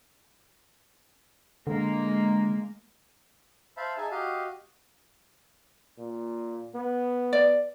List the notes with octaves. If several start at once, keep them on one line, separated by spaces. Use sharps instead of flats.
D3 G#3 A#3
C5 E5 F5 A5 B5
D#4 G#4 E5 G#5 A5
F#4 G4 D#5 F5
A#2
B3
D5